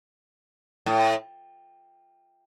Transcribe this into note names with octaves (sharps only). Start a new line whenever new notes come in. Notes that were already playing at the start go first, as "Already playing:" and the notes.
A2